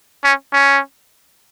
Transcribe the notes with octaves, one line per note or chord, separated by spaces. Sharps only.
C#4
C#4